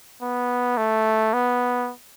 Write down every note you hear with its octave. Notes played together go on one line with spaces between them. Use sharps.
B3
A3
B3